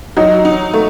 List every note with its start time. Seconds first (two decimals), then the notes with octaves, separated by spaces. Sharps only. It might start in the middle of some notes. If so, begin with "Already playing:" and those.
0.17 F#3 D#4
0.45 D#4
0.74 A3